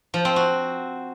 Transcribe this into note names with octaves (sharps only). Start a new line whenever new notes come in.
F3
C4
F#4